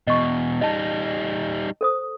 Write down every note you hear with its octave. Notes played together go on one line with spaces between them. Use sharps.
E2 B2 D#5 C#6
G3 D#4 D#5 A5
A4 C5 D#6